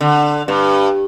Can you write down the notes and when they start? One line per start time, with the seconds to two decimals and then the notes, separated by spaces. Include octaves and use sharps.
0.01 D3
0.48 G2